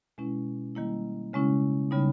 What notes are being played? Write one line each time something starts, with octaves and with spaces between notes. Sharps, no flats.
B2 G#3 C#4 E4
D#3 G3 A#3 E4
C#3 G#3 C#4 E4
C#3 G3 B3 D#4